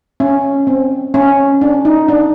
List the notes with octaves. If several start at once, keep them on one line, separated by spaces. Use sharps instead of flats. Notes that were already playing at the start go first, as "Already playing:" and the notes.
C#4
C4
C#4
D4
D#4
D4